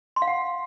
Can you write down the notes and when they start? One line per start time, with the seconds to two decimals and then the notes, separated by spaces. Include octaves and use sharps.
0.16 C6
0.22 F5
0.28 F#5